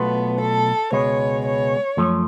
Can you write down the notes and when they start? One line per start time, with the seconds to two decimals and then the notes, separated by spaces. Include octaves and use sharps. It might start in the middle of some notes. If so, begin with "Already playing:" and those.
Already playing: B1 B2 A3 B3 F4
0.39 A4
0.92 C#2 B2 G#3 B3 C#5
1.45 C#5
1.97 F#2 F3 A3